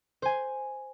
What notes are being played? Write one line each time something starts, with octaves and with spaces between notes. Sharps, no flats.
C5 G#5